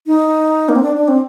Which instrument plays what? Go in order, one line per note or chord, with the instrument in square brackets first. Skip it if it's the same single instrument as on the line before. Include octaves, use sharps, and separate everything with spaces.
[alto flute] D#4
A#3
C4
D4
D4
C4